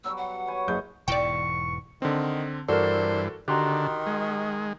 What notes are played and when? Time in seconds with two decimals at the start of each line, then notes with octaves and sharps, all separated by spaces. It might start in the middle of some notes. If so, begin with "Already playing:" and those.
0.04 B2 F#3 G3 E6
0.17 F#5
0.47 B4 C#5 G#5
0.68 F#1 G#4 G6
1.08 E1 G#2 E3 D5 G5 C#6
2.02 D3 D#3 C4
2.68 G2 E3 F#4 A4 A#4 C5 D5
3.48 D3 D#3 F#4 G4 A#5 C6 F#6
4.07 G#3